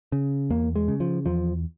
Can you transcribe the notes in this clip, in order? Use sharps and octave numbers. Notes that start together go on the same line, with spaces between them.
C#3
E2 A#3
G#3
C#3
F3
E2 F3